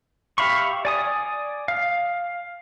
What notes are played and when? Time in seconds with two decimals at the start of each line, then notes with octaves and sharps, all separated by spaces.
0.38 G4 E5 F5 B5 C#6
0.85 D5 G#5 D#6
1.68 F5